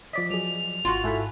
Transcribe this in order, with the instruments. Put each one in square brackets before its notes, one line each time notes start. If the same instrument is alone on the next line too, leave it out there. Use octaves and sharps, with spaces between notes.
[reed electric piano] F3 D5 D#5 [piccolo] B6
[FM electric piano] F#3 G#4 [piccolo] F7
[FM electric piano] G#1 [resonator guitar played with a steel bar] F4 F#4
[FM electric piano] G#2 G#5 F#6 [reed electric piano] E4 A4 B5